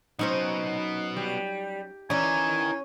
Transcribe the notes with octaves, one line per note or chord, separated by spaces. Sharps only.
F#3 B3 C#4 D#4 F#4 C5
G3
E3 C#4 D#4 A#4 D5 G#5